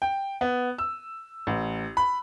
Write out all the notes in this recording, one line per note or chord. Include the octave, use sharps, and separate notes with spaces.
G5
B3
E6
A1
B5